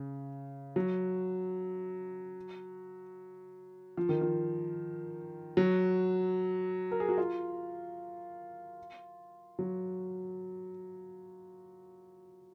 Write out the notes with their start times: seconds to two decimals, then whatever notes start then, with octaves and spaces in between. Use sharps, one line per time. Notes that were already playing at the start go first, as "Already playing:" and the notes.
Already playing: C#3
0.76 F#3
3.97 F3
4.09 D#3
4.21 F3
5.57 F#3
6.92 A#4
7.00 G#4
7.09 F#4
7.18 F4
9.59 F#3